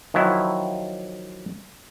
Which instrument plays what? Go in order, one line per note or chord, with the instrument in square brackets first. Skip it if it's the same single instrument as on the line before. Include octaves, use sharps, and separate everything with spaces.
[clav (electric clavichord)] D#3 F3 F#3 E4